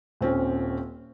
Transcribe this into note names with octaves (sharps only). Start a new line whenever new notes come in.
D#1 C4 C#4